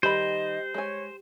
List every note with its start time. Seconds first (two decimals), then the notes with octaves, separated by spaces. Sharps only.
0.03 D#3 G3 G4 C5 D#5 B5
0.74 G#3 C#5 G#5